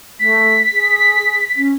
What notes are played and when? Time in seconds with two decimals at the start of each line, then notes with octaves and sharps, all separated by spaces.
0.19 A3 B6
0.72 G#4
1.56 C#4